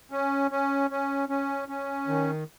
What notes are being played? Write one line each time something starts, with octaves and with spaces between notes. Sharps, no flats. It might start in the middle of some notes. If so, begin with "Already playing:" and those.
C#4
C#4
C#4
C#4
C#4
D#3